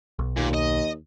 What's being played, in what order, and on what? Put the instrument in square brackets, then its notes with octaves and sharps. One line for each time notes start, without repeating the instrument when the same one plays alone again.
[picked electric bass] B1
[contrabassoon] D#2 [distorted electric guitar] A#2
[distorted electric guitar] D#5